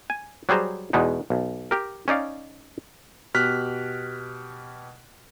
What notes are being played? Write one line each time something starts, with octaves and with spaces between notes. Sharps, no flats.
G#5
F#3 G3 G#4 C5 A#5
E2 B2 G#3 B3 D#4
B1
G4 A#4
C#4 D#4 D5 F5
B2 G4 F6 F#6 B6